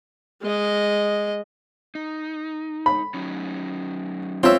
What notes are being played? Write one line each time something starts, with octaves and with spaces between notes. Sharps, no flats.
G#3 D#5
D#4
B5
F#3 C#4 D#4
C4 F4 C#5 E5 E6